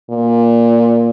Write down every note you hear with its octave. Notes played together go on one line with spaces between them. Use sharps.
A#2